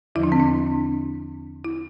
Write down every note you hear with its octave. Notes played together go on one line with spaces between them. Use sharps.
E2 D3 F3 E4
D4
C4
D4
E4